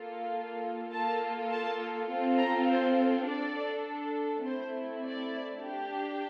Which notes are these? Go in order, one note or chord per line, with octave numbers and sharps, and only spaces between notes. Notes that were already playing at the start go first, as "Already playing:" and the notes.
Already playing: A#3 F4 A4
A#3 F4 A4 A5
A5
C4 F4 A4
A#5
C5
D4 A4 D5
A3 C4 E4 C5
D5
D4 G4